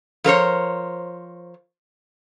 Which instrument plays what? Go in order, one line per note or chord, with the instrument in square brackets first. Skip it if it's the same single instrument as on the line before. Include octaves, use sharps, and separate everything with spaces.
[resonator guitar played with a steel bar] F3 A#4 C5 C#5